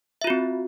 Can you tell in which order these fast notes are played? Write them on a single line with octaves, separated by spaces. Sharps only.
E5 F4 F#4 C4